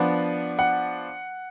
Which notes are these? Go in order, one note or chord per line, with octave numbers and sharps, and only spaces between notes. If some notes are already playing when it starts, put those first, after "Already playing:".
Already playing: F3 B3 D4 F#5
F#5